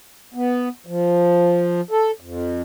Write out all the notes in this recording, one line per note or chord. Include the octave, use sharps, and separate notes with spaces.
B3
F3
A4
F2